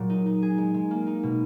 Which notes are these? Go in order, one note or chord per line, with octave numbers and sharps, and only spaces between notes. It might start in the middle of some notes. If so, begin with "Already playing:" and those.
Already playing: A#2 F#3 G#4
D#4
D#4
G#4
G#3
G#3
A#3
D#4
B2